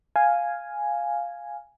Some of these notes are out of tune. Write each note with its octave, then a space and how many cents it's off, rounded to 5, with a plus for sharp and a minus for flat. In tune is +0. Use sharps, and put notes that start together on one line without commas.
F5 +0 G#5 +0